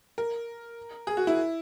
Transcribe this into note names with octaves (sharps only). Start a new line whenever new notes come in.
A#4
G#4
F#4
E4